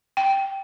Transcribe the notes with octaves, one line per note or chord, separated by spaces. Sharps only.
G5